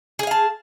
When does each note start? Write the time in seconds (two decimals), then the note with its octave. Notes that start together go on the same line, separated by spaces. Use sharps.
0.19 G#4
0.23 G#5
0.27 F5
0.31 A5